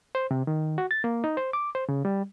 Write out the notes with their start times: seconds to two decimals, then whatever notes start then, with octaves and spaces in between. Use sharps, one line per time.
0.15 C5
0.31 C3
0.47 D#3
0.78 F#4
0.91 A6
1.04 A#3
1.24 D#4
1.37 C5
1.53 D6
1.75 C5
1.89 C#3
2.05 G3